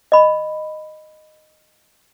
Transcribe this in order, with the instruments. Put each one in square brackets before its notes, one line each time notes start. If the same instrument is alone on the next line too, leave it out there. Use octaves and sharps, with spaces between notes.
[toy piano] D#5 B5